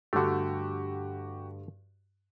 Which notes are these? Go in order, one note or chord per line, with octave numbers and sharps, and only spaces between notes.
G2 D3 A3 F#4 G4